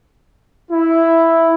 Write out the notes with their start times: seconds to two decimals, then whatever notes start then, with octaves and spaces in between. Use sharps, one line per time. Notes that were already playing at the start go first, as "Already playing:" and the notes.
0.70 E4